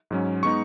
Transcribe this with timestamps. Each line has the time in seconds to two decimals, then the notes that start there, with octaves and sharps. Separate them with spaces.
0.11 G#2 F#3 C#4
0.43 G#3 B3 D#4 C#6